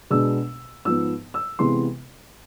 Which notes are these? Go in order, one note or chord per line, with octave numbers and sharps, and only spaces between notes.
B2 G#3 B3 D4 E6
G#2 F3 B3 E6
E6
C3 E3 G#3 B3 C6